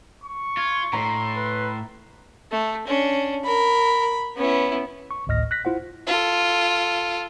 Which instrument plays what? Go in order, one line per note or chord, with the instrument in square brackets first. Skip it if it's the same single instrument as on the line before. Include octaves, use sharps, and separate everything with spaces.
[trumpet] C#6
[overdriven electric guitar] F4 [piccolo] G#6
[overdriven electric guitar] A2 [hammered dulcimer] A#5 [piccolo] C6
[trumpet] B4
[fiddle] A3
C#4 D4
[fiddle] A#4 [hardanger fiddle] B5
[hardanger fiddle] B3 [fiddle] C#4 E4
[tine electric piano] C#6
G#1 D2 A2 D#5 F6 A#6
F#6 A#6 B6
E4 F4 C5 F#5
[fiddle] F4 A4